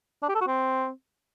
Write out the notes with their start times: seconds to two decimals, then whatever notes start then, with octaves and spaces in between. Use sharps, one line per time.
0.23 D4
0.29 G4
0.35 A4
0.41 F#4
0.47 C4